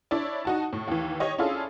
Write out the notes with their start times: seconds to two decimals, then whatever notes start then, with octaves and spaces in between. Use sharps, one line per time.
0.11 D4 E4 C#5 D5
0.45 D#4 F#4 A5
0.73 A2
0.87 D#2 E3
1.20 G4 C#5 D#5
1.38 C#4 D4 E4 F4 G#4 A4